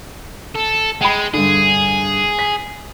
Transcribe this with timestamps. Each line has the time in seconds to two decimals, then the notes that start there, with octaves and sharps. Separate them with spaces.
0.55 A4
1.01 G#3 G5 B5
1.34 G2 D3 G#4
2.39 B6